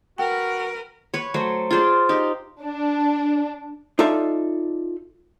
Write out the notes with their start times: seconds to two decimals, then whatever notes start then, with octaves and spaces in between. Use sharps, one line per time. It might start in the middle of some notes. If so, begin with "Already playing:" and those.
0.18 F#4 A#4 B4 G5
1.14 B4 C#5
1.34 F#3 A3 C5
1.71 F4 G#4 C5 D5
2.09 D#4 G4
2.62 D4
3.99 D#4 F4 A4 D5 E5